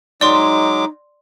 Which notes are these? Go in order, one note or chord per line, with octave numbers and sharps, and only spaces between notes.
F#3 G#3 D#4 D5 C6 D6